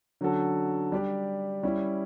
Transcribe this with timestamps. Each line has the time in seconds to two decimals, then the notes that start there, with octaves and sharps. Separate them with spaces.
0.21 D3 F#3 C#4 F#4 A4
0.92 G3 D4 G4 D5
1.63 G3 C#4 E4